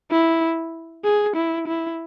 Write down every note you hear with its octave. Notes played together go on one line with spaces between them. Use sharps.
E4
G#4
E4
E4